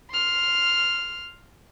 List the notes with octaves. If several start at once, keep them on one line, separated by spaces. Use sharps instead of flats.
C6 F6